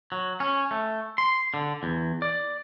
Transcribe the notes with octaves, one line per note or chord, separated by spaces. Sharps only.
F#3
C#4
A3
C6
D3
E2
D5